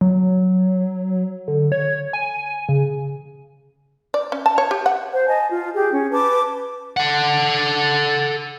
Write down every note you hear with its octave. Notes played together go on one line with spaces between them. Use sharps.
F#3
D3
C#5
G#5
C#3
D5
C#4
A5
C#5
G4
F#5
C5
D#5 G#5 A5
F4
G4 G#4
C#4
B4 A5 D6
A4 F#5